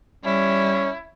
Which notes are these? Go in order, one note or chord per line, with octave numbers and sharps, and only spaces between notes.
G3 C#4 E4